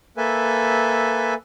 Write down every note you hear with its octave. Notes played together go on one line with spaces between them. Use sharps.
A#3 A4 B4 E5 G#5